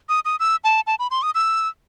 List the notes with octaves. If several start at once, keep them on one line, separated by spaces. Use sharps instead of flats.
D#6
D#6
E6
A5
A5
B5
C6
D#6
E6